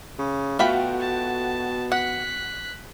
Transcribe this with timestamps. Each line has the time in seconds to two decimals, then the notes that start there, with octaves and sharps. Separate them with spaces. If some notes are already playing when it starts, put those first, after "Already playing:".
0.19 C#3
0.59 B2 A3 F4 F#4 G5 B5
1.00 A5
1.92 F#5 F#6 B6